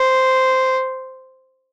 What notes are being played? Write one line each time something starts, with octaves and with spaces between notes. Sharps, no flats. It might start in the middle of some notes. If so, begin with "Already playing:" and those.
Already playing: C5